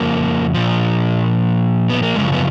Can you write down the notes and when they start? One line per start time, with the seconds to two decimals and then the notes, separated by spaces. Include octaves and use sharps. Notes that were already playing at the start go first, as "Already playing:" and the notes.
Already playing: F2 C#3 F3 A#3
0.54 A#2 F3
1.90 B3
2.03 A#3
2.15 F#2 C#3 F3 G#3
2.34 B3